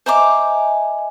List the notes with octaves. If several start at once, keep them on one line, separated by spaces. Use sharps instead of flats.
C5 D#5 E5 G#5 A#5 D6